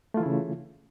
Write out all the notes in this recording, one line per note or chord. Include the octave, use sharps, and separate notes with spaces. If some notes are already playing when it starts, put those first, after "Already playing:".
C#3 E3 A3 E4 F4